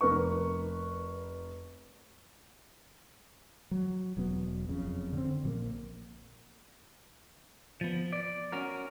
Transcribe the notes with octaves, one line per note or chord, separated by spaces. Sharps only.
F1 A#4 B4 C#6
F#3
E1 F#3 B3
F#1 F2 C#3
D3 C4
A#1 F3 A#3
F3 B3
D5
C#4 F#4 A#4